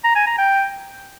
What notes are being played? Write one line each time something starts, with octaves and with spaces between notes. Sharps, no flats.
A#5
G#5
A#5
G5